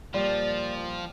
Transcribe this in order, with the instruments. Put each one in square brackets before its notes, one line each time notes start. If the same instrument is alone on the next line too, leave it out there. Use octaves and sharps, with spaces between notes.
[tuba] A#2 [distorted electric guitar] F3 [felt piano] G3 [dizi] D5